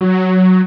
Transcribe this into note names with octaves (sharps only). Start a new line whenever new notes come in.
F#3